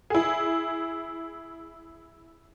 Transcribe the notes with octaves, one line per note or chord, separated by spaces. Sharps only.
E4 G#4